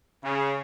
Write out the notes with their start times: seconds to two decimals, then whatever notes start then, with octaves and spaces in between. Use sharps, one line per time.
0.23 C#3